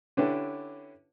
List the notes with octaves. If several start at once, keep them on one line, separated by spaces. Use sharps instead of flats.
D3 C#4 D4 E4 G4 B4